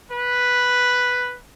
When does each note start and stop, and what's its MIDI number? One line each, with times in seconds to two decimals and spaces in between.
0.11 1.36 71